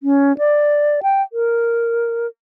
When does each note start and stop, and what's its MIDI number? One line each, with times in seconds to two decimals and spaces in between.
0.03 0.36 61
0.38 1.00 74
1.03 1.22 79
1.33 2.27 70